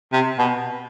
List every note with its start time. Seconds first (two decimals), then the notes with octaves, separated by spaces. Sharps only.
0.13 C3
0.39 B2